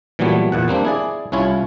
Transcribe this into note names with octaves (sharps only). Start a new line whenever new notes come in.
A#2 E3 F#3 G3 A3 B3
E2 A#2 F#5
G3 A#3 C4 D4
E4 G#4 D5
C2 C#4 E4 F4 C#5